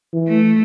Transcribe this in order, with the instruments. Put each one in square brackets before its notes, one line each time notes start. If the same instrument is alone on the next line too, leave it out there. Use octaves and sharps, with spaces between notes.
[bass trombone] E3
[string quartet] A3